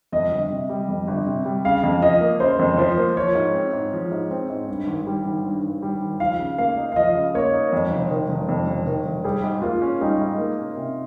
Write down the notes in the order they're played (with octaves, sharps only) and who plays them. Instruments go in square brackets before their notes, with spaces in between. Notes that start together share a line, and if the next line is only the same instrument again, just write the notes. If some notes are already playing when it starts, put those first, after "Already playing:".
[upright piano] F2 [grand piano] D#5
[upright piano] G1
C3
G3
F2
G1
C3
G3
[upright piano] C#3 [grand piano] F5
[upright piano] F2
[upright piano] F3 [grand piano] D#5
[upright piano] A#3
[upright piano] C#3 [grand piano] C5
[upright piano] F2
[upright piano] F3 [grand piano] C5
[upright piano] A#3
[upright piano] F3 [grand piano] C#5
[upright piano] G#2
C4
G#2
F3
G#2
C4
G#2
G2
G#1
G3
G#1
G2
G#1
G3
G#1
[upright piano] F3 [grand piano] F5
[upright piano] C#3
[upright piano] A#3 [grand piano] F5
[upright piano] D#4
[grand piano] F5
[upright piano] F3 [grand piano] D#5
[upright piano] C#3
[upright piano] A#3 [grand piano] C#5
[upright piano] D#4
F2
F1
D#3
F1
F2
F1
D#3
F1
[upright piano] G3 [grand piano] G#4
[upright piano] G#2
[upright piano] A#3 [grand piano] F4
[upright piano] C#4
[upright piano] G3 [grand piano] D#4
[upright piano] G#2
A#3
C#4
C3